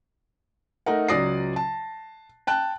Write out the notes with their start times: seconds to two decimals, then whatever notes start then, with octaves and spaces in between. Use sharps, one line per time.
0.86 A3 D#4 A#4 F#5
1.08 C#2 F#3 D5 D#6 A#6 C7
1.56 A5
2.47 G5 A5 F#6